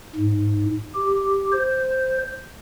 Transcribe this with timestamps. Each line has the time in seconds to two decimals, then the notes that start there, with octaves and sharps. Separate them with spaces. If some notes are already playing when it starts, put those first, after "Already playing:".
0.16 G#2
0.94 G4
1.52 C5